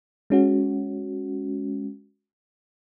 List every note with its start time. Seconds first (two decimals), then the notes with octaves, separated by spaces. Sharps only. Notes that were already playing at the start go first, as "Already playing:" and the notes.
0.30 G#3 C#4 F#4